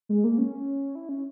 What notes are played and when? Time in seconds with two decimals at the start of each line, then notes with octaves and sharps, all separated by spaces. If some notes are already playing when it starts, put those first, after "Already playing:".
0.09 G#3
0.24 A#3
0.38 C#4
0.95 E4
1.09 C#4